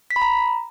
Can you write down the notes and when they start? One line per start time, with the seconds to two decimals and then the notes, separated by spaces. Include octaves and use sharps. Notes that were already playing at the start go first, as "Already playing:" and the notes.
0.11 B6
0.16 B5
0.22 A#5